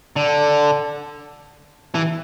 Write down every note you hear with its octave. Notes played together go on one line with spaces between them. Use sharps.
D3
E3